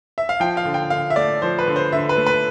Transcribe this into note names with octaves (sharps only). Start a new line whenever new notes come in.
E5
F5
F3 G5
F5
D3
G5
D3 F5
E5
A3 D5
F3 C5
B4
D3
C5
D3 E5
B4
A3
B4